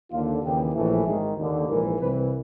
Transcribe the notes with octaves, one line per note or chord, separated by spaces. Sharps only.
D#2 D3 F4
D#2 C#3 E3 G4
A#1 A2 E3
G#1 G#2 D#3 G#4
D#2 D3
A#1 G#2 E3 A#4
C2 C3 E3 B4